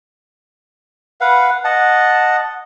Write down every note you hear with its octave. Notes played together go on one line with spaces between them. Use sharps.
B4 F5 F#5
D#5 F#5 A5